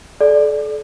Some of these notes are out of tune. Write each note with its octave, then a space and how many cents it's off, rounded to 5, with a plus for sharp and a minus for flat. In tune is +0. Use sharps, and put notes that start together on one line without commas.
A4 -35 D5 +0